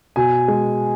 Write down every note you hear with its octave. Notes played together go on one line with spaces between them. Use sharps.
B2 G#5
G#3